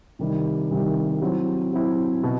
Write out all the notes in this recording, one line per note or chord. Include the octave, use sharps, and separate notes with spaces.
C2 C3 D#3 G3
C2 C3 D#3 G3
F#3 C4 E4
F#3 C4 E4
B2